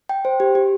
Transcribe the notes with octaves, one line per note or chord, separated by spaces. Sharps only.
G5
C5
G4
G4